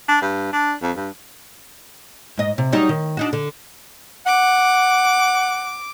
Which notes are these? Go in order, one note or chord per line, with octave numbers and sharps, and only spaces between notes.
D4
G2
D4
F2
G2
G#2 D#5
C3
F#3 G3 D#4
D#3
D4 D#4 F#4
D3
F#5 D6